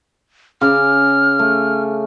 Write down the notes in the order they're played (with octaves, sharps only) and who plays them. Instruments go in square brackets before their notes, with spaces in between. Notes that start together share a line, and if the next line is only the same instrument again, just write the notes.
[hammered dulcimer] C#3 D6 [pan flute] F6
[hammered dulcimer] A3